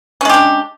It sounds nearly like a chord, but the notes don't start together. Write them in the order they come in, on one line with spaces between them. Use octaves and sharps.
C#4 G#3 G4 D4